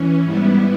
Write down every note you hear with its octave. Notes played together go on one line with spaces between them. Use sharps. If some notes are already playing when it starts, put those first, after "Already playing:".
Already playing: E3 C#4
G#2 G3 B3 E4